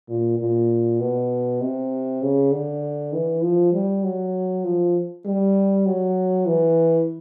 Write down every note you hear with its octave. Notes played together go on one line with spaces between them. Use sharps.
A#2
A#2
B2
C3
C#3
D3
E3
F3
G3
F#3
F3
G3
F#3
E3